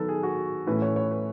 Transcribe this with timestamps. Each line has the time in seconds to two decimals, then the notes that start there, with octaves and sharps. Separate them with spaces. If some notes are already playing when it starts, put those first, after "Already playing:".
Already playing: D#3 F#3 B3 A4 B4
0.09 G#4
0.23 F#4
0.67 A2 E3 A3 C#4 B4
0.82 C#5
0.96 C#5
1.11 B4